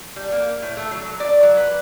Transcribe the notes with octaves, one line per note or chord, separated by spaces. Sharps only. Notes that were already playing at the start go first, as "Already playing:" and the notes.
G3
A#3
A2
A3
F#3
D5
F#3
B4